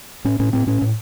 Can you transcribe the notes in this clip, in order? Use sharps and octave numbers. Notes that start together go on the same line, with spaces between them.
A2 C#4
A2 C#4
A2 C4
A2 C#4
A2